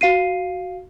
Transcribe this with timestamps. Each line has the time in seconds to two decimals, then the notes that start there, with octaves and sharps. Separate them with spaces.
0.01 F#4 F5 C7 D#7